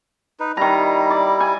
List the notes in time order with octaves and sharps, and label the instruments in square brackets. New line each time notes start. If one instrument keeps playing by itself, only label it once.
[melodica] D#4 B4
[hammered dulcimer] D#3 A#5 [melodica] G3 E4
[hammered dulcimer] D5
G#5